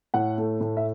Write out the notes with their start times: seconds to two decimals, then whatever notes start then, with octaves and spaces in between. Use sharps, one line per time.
0.14 A2 F#5
0.38 A3
0.61 A2
0.77 E5